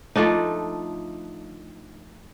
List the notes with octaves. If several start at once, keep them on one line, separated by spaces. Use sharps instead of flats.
F3 A3 D4 D#4